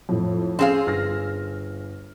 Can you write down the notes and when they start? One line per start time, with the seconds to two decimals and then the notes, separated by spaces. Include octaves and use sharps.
0.09 F2 A2
0.59 C4 C#4 G#4 F5
0.86 G1 F6 A#6